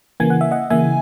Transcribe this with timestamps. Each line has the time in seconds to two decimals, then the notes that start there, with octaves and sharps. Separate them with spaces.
0.20 C#3 E3 A#3 G#5
0.30 F#5
0.41 E5
0.51 D#5 F#5
0.70 C#3 E3 A#3 E5 G#5